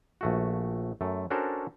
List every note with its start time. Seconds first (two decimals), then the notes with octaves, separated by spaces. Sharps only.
0.21 A#1 A3 F#4
1.01 F#2 A3
1.30 C#4 D4 F#4 A4 A#4 C5